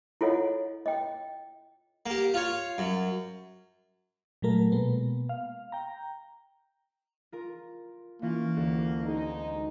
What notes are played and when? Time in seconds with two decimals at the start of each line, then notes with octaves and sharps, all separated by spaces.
0.21 E4 F4 A4 C#5 D#5 F#5
0.86 D#5 G5
2.06 A#3 G4
2.34 F4 C#5
2.78 F#2
4.42 A#2 F#3 A3 A#4
4.72 B2 G#3 A#3 B3
5.29 F5
5.72 G5 A#5
7.32 F4 A#4
8.22 E3 A#3 C#4 F4
8.56 D2 F#4 A4
9.05 G#3 D#4